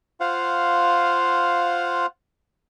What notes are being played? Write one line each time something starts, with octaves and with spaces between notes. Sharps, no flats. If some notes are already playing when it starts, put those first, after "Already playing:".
F4 C5 F5 F#5